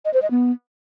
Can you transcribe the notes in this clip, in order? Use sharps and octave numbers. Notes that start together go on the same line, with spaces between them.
D#5
C5
D#5
B3